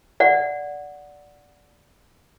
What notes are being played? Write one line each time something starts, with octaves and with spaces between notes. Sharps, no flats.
D5 F#5